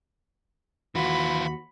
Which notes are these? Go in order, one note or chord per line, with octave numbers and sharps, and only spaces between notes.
D#2 E3 F4 F#4 B5